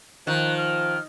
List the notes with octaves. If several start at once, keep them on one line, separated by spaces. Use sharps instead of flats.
D#3 F3 F#6
F6